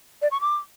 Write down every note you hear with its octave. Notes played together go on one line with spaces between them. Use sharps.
D5
C#6
D6